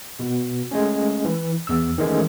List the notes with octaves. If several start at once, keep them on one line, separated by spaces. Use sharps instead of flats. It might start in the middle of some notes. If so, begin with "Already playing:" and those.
B2
G#3 A3 C#4
E3
E2 E6
D#3 E3 G#3 A3 C#4